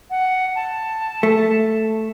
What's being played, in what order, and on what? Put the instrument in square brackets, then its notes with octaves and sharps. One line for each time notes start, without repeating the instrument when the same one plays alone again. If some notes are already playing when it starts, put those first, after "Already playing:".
[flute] F#5
A5
[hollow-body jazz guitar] A3